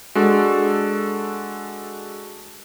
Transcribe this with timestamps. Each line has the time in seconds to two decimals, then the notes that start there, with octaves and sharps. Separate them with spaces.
0.15 G#3 D4 F#4 A4